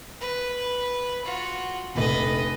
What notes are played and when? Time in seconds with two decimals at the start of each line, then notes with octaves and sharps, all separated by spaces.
0.21 B4
1.25 F4 F#4
1.95 F1 A#1 B4 D#5